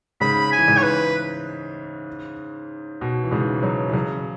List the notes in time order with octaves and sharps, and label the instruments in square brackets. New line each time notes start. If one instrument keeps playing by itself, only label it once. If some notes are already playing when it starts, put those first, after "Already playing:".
[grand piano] G#2 C#3 [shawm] B5
[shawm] G#5
[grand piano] E3
G#2 C#3
[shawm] C#5
B4
[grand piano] B2
E3
G#2 C#3
C#3 F#3
E3
C#3 F#3